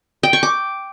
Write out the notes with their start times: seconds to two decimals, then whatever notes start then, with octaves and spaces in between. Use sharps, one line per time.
0.23 G5
0.33 C#6
0.43 D6